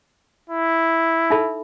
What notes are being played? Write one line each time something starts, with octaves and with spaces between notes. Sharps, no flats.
E4
D#4 A4 E5 B5